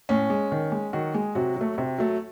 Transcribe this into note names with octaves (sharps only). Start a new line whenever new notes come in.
A2 C#4
G#3
D#3
G#3
D#3 F#3 F#4
G#3 G#4
C3 F#3 F#4
F#3 A3
C3
F#3 A3